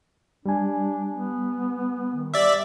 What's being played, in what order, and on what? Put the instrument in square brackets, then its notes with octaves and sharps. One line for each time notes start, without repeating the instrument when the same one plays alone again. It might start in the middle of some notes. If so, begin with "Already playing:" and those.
[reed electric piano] G3 G#5 [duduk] D4
[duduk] B3
D#3
[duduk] G4 [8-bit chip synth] D5 E5